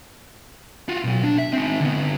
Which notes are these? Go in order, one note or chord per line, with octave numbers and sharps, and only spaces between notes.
F4 F#4
B2 F#3
D4
E5
C4 D#4
D3 B3